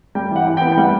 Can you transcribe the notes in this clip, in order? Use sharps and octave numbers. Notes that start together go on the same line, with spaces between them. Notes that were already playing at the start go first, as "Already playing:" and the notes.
G3 G5
E3
F#5
E3
B3 G5
G5
G3 F#5